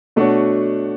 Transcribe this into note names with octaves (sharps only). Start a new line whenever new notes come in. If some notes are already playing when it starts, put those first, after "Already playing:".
B2 A3 D4 F#4 C#5